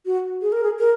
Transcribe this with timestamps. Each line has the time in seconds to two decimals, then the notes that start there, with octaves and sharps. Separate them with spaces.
0.06 F#4
0.42 G#4
0.52 A#4
0.63 G#4
0.79 A#4